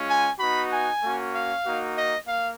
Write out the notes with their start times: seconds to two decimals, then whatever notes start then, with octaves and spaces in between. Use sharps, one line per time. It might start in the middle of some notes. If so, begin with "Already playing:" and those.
Already playing: G#3 C#4 F4
0.08 G#5
0.39 B3 D#4 F#4 B5
0.71 G#5
1.02 A#3 C#4 F#4
1.33 F5
1.65 A#3 D#4 F#4
1.95 D#5
2.26 A#3 F5